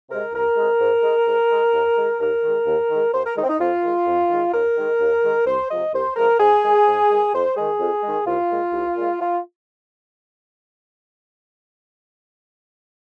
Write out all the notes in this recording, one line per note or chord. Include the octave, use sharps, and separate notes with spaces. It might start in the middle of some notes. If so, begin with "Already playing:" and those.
C3 G#3 A#4
C2 A#4
C3 G#3
G#2
G#3
G#2
G#3
D#2
D#3 G#3
D#2 A#4
D#3 G#3
D#2
D#3 G#3
D#2 C5
A#4
D#3 G#3 D#4
C4
D#4
F2 F4
D#3 G#3
F2
D#3 G#3
D#2 A#4
D#3 G#3
D#2
D#3 G#3
C2 C5
C3 F3 G#3 D#5
C2 C5
C3 F3 G#3 A#4
G#2 G#4
D#3 G#3
G#2
D#3 G#3
F2 C5
D#3 G#3 G#4
F2
D#3 G#3
C2 F4
A#2 G#3
C2
A#2 G#3
F4